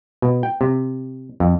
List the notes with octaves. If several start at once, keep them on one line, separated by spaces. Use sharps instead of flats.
B2
G5
C3
F2